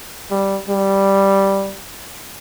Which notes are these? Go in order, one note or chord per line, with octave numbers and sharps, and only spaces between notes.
G3
G3